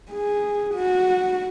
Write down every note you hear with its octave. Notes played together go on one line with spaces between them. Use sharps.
G#4
F#4